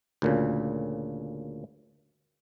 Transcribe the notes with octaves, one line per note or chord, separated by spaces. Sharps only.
D2 A#2 C#3